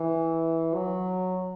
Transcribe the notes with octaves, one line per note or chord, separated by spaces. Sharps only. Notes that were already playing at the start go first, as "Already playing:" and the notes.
Already playing: E3
F#3